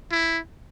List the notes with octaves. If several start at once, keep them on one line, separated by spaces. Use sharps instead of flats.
E4